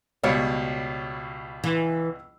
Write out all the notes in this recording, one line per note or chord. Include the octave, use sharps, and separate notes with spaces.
C#2 B2 G3 C#5
E3